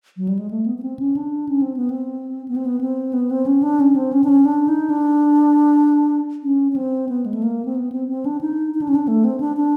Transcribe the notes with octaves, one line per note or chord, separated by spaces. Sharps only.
F#3
G3
G#3
A3
B3
B3
C4
C#4
D4
C#4
C4
B3
C4
B3
C4
B3
C4
B3
C4
C#4
D4
C#4
C4
C#4
D4
C#4
D4
D#4
D4
C#4
C#4
C4
B3
G#3
A3
A#3
C4
B3
C4
C4
D4
D#4
D#4
D4
C#4
D4
A3
C4
D4
D4